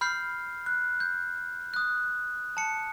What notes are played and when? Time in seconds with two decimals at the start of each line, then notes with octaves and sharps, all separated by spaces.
0.01 B5 F6 G6 C7
0.66 F#6
1.00 G6
1.74 D#6 F#6
2.57 A5 C#7